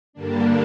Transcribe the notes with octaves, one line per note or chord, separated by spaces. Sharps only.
G2 D3 G3 A#3 D4